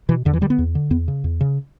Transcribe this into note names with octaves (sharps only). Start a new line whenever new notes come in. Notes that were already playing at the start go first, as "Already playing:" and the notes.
B2 E3
E2 D3
E3
D3 G3
B3
E2
D3
E2 B3
C#3
E2
C#3